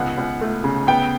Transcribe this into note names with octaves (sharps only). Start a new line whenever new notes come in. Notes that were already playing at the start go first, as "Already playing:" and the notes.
Already playing: C#2 B3 F#5
C#2
A3
C#3
B3 G5